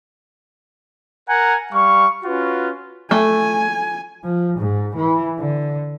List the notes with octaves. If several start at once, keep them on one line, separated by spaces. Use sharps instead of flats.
A#4 F#5 G#5 A#5
G3 F5 C#6
C#4 F4 F#4 B4
A3 G#5
F3
G#2
E3
D3